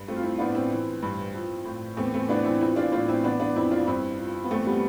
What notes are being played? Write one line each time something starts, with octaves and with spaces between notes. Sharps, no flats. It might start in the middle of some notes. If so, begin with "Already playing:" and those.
Already playing: G2
F3 A3 C4
F4
C4 E4
A2 B3 D4
C4 E4
E3
G2
F3
A2
E2 A3 C4
A3 C4
E3 B3 D4
C4 E4
F3 C4 E4
D4 F4
A2 D4 F4
C4 E4
E3 B3 D4
B3 D4
F2 C4 E4
D4 F4
G2 C4 E4
F3
B3
E2 A3 C4
G3 B3